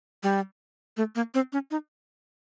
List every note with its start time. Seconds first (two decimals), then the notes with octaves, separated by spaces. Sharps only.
0.23 G3
0.97 A3
1.15 A#3
1.34 C4
1.53 C#4
1.71 D#4